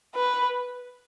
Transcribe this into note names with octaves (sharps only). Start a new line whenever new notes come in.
B4